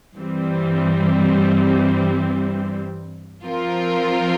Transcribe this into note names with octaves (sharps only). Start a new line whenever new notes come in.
G2 E3 G3 C4
F3 C4 F4 A#4